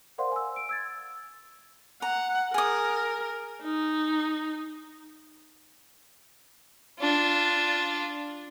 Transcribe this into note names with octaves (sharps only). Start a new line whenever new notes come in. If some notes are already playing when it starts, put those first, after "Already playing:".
A#4 C5 D5 F5 F#5 C6
G#5 E6
D7
E6 G#6 A6
F#5 A#5
G#4 A#4 D#6
D#4
D4 F4